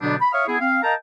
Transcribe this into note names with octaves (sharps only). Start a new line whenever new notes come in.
B2 D3 F#3 G3 B3 D4
B5
C#5 E5 F5 C#6 D#6 F6
B3 E4 G#4
C4 F5
A#4 D#5 F5 G5 A5 A#5